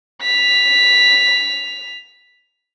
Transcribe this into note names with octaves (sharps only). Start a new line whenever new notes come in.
B6 F7